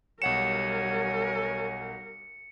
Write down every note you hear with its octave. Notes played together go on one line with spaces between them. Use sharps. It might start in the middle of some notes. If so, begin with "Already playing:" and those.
B1 G3 A#4 C#5 F#5 G#5 C#7 E7